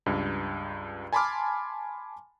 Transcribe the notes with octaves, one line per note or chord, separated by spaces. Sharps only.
C#2 G2
G#5 A5 B5 C6 D6 F6